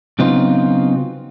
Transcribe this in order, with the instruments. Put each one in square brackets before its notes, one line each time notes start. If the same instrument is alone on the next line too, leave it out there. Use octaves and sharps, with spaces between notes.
[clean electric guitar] C#3 F#3 B3 C4 D#4 F4